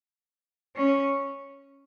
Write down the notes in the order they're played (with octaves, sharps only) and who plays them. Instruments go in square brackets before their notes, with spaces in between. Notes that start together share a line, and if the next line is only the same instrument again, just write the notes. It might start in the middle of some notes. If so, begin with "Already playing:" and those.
[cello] C#4